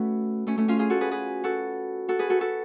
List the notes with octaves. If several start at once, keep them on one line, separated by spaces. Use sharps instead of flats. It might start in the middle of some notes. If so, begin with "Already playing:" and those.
Already playing: A3 C#4 F#4 B4
A3 C#4
A3 C#4
C#4 F4
F4 G#4
F#4 A4
G#4 B4
G#4 B4
F#4 A4
F#4 A4
G#4 B4
F#4 A4
F#4 A4